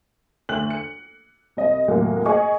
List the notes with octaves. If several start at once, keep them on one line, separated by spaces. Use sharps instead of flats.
D2 F#6 F#7
C#7
C2 D#5
D#2 A2 C3 F#3 G#3 A#3
G#4 D#5 G#5 C#6